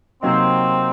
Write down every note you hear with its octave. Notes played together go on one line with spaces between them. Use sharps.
C3 F#3 A#3 C4 D#4